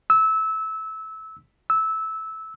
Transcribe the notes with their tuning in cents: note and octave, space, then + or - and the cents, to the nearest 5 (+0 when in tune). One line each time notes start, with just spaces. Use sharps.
E6 -20
E6 -15